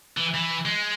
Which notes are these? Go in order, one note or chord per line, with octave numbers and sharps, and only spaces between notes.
E3
E3
G#3